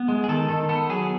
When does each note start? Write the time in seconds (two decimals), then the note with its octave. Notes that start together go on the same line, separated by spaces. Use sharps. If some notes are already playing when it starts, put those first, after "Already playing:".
Already playing: B3
0.08 G#3
0.24 G#4
0.29 D#3 A4
0.49 D#3 A4
0.69 B3 A4
0.90 F#3 G#4